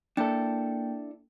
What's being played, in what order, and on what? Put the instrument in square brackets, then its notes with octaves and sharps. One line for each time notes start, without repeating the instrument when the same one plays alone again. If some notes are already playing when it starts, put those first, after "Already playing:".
[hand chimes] A#3 G5 [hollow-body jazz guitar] D4 E4 A4